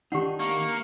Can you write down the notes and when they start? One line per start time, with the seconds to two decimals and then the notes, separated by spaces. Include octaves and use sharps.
0.12 D#3 D4 D#4 G4 F#5
0.40 A#3 C#6